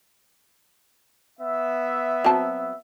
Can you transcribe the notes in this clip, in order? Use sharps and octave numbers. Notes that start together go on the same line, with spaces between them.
B3 E5
F#3 C4 A5